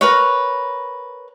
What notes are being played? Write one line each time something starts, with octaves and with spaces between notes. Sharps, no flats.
A#4 B4 C#5